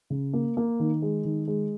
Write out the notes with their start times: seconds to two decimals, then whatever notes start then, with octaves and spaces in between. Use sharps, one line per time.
0.10 C#3
0.33 A#3
0.57 A#3
0.80 D#3
1.02 G#3
1.25 D#3
1.48 G#3